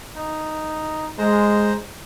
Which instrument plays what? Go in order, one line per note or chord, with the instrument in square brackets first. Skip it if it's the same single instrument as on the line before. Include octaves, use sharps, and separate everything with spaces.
[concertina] D#4
[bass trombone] G#3 [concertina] C5 A#5